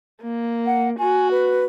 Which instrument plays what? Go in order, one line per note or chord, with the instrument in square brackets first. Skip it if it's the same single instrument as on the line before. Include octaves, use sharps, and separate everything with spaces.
[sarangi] A#3
[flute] F#5
[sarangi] F#4 [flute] G#5
[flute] B4